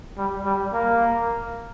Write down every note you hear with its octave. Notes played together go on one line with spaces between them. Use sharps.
G3
G3
A#3